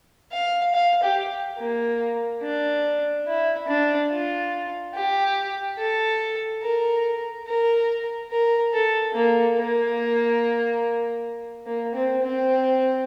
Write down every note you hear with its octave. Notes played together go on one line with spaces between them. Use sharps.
F5
F5
G4
A#3
D4
E4
D4
F4
G4
A4
A#4
A#4
A#4
A4
A#3
A#3
A#3
C4
C4